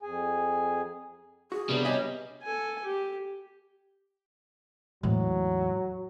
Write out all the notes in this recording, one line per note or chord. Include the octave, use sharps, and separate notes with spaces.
F2 G#4 G#5
F#4 G#4
C3 G3 B3 D4
C#5 D#5 E5 G#5
A4 G#5
G4
E2 A2 E3 F#3 G#3 C4